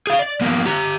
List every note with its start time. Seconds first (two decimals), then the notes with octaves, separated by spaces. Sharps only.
0.07 G#4 F5
0.19 D5
0.41 F3 A#3 B3
0.66 G4 A#5